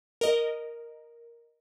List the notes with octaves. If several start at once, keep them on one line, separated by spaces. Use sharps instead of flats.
A#4 D#5